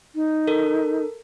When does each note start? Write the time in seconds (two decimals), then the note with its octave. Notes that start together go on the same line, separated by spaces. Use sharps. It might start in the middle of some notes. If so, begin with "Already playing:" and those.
0.15 D#4
0.47 A4 A#4